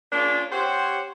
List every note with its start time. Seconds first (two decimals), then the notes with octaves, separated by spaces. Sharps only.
0.11 A#3 C#4 D4 F4 G#4
0.51 C4 G4 C5 C#5 F#5